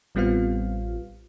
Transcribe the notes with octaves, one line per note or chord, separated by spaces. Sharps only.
A1 G3 B3 C4 F4 F5